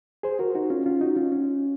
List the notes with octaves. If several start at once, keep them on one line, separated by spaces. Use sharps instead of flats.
G#4 C5
F#4 A#4
D#4 F#4
C#4 F4
C#4 F4
D#4 F#4
C#4 F4
C#4